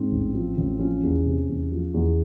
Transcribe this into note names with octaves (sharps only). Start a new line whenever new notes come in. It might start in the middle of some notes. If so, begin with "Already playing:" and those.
Already playing: G#2 C4
A1
F3
A1
F3 C#4
E2
C3
E2
F3
E2